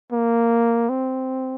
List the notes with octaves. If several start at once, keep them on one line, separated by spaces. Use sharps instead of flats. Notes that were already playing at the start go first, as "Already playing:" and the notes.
A#3
C4